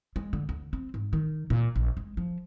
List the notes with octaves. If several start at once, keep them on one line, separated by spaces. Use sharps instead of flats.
G#3
D3
D2
C4
G#2
D#3
A#2
A#1
G#3
F3